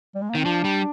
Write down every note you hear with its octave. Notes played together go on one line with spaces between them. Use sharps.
G3
G#3
A#3
D#3 C4
F3 D4
G3